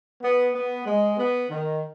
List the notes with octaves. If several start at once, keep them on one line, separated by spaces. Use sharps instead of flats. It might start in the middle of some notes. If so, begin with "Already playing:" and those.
B3
B3
G#3
B3
D#3